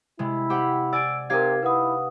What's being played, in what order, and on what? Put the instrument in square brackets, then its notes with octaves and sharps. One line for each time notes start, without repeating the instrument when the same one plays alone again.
[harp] C3 G#3 [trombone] E4
[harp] G4 C5 F#5
[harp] D5 G#5 A6 [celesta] E6 D7
[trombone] C3 [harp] D#4 G4 F5 [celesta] A#4 G#6
[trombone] E4 [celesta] B4 F#5 D#6